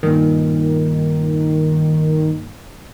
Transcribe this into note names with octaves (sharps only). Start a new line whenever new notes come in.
G2 A#2 D#3